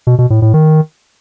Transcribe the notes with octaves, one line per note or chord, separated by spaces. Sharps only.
B2
B2
A2
A2
D#3